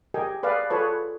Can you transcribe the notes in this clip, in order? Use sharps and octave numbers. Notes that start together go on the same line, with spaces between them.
G4 G#4 A#4 D#5 G5 G#5
G#4 B4 D5 F5
F4 G#4 A4 B4 C#5 A5